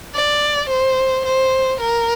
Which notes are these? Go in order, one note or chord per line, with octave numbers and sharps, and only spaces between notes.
D5
C5
C5
A#4